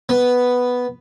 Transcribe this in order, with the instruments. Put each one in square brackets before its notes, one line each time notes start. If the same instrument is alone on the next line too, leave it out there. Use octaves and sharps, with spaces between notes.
[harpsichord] B3